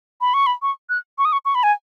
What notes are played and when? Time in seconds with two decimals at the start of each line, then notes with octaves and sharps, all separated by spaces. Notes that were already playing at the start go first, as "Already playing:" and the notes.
0.21 B5
0.34 C#6
0.47 B5
0.62 C#6
0.89 F#6
1.18 C#6
1.25 D#6
1.33 C#6
1.45 C#6
1.55 B5
1.63 G#5